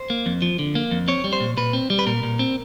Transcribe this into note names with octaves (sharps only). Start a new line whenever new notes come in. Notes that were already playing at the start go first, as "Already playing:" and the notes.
Already playing: C5
A#3
F2
F3
D3
A#3
F2
C4 C#5
G3
C5
A#2
A#2 B4
C4
G3
B4
A#2 A#4
A#2
C4